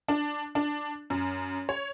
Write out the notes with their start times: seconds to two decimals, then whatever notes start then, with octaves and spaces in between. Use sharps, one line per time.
0.08 D4
0.55 D4
1.10 F#2
1.69 C#5